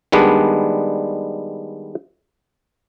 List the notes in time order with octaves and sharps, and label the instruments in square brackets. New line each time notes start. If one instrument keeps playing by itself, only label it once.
[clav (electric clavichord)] D#3 G3 G#3 B3 D4